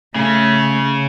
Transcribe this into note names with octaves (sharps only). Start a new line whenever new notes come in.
C#3 A3